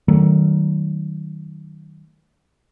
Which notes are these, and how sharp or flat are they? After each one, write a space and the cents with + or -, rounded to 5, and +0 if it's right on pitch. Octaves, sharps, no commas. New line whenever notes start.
D#3 +0 F#3 +30 A3 +0